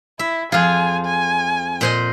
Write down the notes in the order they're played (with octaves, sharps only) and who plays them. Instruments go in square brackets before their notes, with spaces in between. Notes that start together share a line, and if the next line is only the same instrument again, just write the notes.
[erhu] E4 [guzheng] E5
[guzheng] F2 G#4 [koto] F4 F5 [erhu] G#5
[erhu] G#5
[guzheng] A#2 C5 D#5